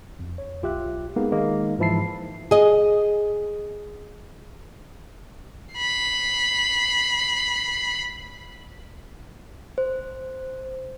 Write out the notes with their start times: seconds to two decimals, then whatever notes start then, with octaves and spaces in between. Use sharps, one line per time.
0.19 F2
0.38 C#5
0.63 B1 F4 G4 E5 F#6
1.16 G#3 A#3 B3 D#4 G#4
1.32 D#3 G#3 A#3 D#4
1.78 G#2 E3 F3 E4 A5 C7
2.51 G#4 D#5
5.75 B5 C7
9.78 C5